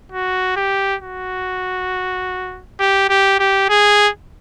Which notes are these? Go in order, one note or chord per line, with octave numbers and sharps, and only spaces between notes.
F#4
G4
F#4
G4
G4
G4
G#4